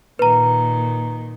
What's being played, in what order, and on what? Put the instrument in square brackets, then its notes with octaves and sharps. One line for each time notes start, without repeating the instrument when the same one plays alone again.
[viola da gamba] A#2 D#3 [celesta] B4 A#5